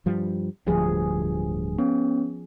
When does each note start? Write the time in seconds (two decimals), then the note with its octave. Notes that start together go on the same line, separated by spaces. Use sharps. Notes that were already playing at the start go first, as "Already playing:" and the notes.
0.06 G2 F3 G3
0.67 D1 D2 G2 F3 G#4
1.79 B3 C#4